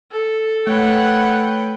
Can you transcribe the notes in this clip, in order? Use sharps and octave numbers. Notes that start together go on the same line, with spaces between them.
A4
A3 B4 C#5 F#5 G5